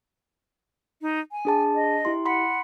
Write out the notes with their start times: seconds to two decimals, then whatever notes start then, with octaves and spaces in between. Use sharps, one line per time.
1.02 D#4
1.32 G#5
1.45 D4 G#4 A5
1.75 D#5
2.05 E4 G4 C6
2.25 F#5 B5 C6 B6